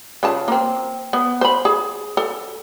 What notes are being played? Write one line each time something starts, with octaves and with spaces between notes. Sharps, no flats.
C#3 F4 A5
A#3 C4
B3
C5 B5
G#4
A4